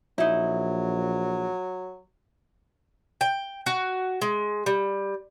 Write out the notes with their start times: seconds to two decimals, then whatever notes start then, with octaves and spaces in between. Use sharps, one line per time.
0.18 A#1 F#3 D#4 E4
3.21 G5
3.66 F#4
4.22 G#3
4.66 G3